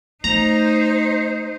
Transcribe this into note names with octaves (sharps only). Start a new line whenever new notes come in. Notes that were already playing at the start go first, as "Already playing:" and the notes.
A3 D#4 C5 A#5